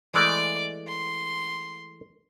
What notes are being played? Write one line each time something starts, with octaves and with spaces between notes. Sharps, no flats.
E3 G#3 A3 D5 D6
C6